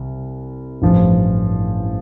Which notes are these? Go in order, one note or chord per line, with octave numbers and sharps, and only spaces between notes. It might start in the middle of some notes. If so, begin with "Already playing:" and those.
Already playing: C2
A1 G2 F3